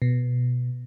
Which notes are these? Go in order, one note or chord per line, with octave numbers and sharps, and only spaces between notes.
B2